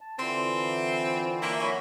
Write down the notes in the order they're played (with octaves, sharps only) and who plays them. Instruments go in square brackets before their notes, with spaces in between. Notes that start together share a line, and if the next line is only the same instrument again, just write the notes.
[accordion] A5
[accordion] D3 E3 [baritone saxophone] C4 [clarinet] F4 [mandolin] C6
[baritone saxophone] A#3 [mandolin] D4 E4 C#5 [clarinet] E5
[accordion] F#3 [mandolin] G#5 B5 [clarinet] C#6